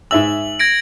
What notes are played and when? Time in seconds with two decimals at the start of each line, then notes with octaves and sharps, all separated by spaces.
0.11 G#2 E5 E6 F#7
0.59 G#6 A#6 D7